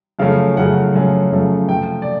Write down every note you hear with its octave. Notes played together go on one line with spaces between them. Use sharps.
F#2 C#3 F3 A3 C#4 F5
F#2 C#3 F3 A3 C#4 F#5
F#2 C#3 F3 A3 C#4
F#2 C#3 F3 A3 C#4
C3 F3 A3 G5
D5